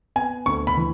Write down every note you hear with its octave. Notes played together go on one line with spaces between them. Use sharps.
B3 G#5
D2 C#6
B5
E3